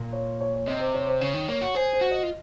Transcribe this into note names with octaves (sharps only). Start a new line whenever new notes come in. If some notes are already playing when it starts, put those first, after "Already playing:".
Already playing: A#2
C#5
C#5
C#5
C3 D#5
C5
C#5
C5
C#3 C#5
D#3
A#3 C#5
F#4
G#4 C5
C5
F#4
D#5
F4